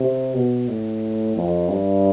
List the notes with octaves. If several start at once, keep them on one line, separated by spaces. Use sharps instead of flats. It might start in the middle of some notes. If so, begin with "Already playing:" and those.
Already playing: C3
B2
A2
F2
G2